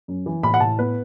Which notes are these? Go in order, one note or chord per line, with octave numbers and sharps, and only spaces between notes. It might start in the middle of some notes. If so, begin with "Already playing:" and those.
F#2
E3
A2 B5
F#5
A2 A5
B3 B4